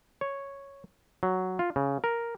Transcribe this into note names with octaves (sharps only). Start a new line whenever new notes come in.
C#5
F#3
F4
C#3
A#4